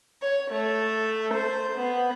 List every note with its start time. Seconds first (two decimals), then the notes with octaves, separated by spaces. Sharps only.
0.22 C#5
0.51 A3
1.35 C5
1.76 B3